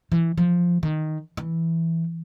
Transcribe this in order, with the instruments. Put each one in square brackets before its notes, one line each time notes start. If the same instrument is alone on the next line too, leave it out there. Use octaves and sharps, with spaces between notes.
[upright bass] E3
F3
D#3
E3